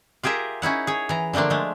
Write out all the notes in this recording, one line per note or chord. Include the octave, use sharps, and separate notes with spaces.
F4 G4 G#4 A#4 E5
C#4 D#4 E4 F#5
G#4 C#5
E3 A#5
D3 F3 A3 A#3 D4
G#3 A3